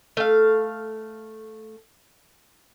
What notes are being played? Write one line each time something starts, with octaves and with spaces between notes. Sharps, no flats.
A3 F5